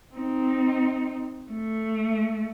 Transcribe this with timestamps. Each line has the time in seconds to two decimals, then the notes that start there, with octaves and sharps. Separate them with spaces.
0.15 C4 D#4
1.51 A3